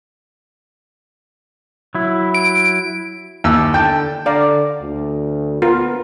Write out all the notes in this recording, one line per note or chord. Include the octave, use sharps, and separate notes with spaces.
F#3 E4
D7
D#2 E6
D3 G5 A5
D3 D5 F5 A#5
D2
B3 F4 A#4